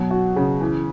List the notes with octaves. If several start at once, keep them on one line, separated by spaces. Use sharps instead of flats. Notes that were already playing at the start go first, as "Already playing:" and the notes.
Already playing: B2 F#3
F#4
C#3
E3